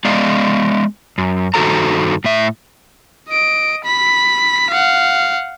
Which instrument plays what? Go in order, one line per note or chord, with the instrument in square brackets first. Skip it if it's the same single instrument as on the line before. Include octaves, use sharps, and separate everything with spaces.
[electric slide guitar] G#3 B3 D5 D#5 F5
F#2
G2 D#3 F#4 A4 C5 A#5
A2 E5
[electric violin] D#5 D7
B5 B6
F5 F#5